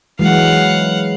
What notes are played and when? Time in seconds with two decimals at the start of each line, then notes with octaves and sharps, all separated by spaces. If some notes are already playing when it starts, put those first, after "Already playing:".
0.19 E3 F#3 G#3 F5 F#5